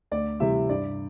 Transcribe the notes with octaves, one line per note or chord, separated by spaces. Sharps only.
D2 D5
C3 E3 G3 E5
G2 D5